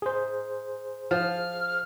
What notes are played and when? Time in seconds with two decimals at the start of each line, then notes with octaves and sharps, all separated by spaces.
0.02 G#4 C5
1.11 F3 F6